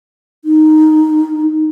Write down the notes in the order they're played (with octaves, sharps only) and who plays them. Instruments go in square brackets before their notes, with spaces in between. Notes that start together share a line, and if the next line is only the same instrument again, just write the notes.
[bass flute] D#4